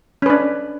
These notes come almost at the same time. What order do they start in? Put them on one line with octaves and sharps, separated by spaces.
C#4 B4 D4